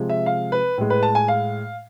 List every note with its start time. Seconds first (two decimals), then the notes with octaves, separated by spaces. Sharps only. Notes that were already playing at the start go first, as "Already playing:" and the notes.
Already playing: C3 F3 G#3
0.09 E5
0.26 F5
0.52 B4
0.78 A2 G#3
0.90 B4
1.03 A5
1.15 G#5
1.28 F5